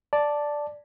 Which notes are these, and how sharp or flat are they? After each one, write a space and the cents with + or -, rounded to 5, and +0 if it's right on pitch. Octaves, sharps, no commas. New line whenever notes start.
D5 +0 A5 +0